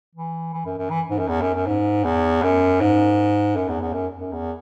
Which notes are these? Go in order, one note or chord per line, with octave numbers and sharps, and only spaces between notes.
E3
E3
F#2
F#2
E3
G#2
F#2
E2
F#2
F#2
G#2
E2
F#2
G#2
F#2
E2
E2
F#2
F#2
E2